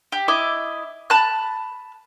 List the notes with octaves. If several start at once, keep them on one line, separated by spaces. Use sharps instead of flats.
G4
E4 D#5 D6
A5 B5 F#6